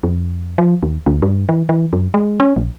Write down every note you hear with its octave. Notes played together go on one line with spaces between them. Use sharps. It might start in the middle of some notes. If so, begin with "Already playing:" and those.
F2
F3
D#2
D2
G2
E3
E3
F#2
G#3
C#4
A#1